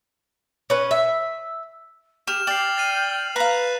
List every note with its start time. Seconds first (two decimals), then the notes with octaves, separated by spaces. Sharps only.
0.70 C#4 B4
0.91 E5
2.27 G4 G#4 F6 E7 F7
2.47 D5 G5 C7 F#7
2.77 A6 C7 D#7
3.36 B4 F5 A#5 F#6